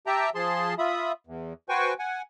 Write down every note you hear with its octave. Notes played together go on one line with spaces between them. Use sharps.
G4 E5 G5 A5 A#5
F3 G#4 A5 C6
F4 E5 B5 D#6
E2
F#4 B4 C5 G5 G#5 C#6
F#5 G#5